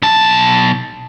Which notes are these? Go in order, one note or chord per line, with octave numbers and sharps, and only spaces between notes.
B1 A5